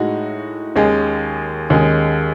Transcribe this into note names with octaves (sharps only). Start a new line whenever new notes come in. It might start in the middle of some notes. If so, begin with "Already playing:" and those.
Already playing: A2 G#3 D#4 F#4
D#2 D#3 G#3 C#4 G#4
D#2 D#3 G#3 C#4 G#4